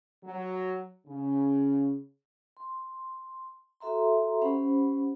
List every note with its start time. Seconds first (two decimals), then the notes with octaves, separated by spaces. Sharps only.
0.24 F#3
1.06 C#3
2.57 C6
3.80 F#4 A4 E5 A#5 C6
4.42 C#4 G4 C5 F#5 B5